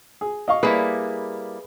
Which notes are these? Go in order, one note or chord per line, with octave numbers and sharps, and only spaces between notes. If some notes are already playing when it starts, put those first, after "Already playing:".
G#4
D#5 F5 C#6
G3 A#3 E4 G#4 B4